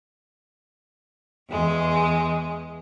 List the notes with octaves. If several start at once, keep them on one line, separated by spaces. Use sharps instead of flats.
E2 G#3